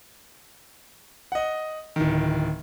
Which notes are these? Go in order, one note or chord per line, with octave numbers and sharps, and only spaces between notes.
D#5 F#5
D1 D#3